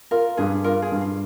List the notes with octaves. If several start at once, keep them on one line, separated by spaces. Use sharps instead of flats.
F4 A#4
G2 G#4
F4 A#4
G#4
G2
F4